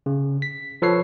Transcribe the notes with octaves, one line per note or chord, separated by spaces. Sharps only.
C#3
B6
F3 A4 B4 C#5 C7